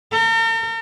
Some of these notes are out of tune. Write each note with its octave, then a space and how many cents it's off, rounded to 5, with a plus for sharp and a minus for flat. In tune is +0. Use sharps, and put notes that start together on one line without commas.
A#4 -45